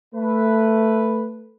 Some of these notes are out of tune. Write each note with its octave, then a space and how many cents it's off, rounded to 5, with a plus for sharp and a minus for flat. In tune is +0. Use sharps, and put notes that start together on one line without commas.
A3 +10 B4 +0